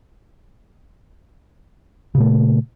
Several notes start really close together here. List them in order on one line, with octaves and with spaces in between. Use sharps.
C#3 A#2 A3